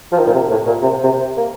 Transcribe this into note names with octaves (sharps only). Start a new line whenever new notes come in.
F3
D#3
A#2
C3
A2
A#2
C3
C3
A#3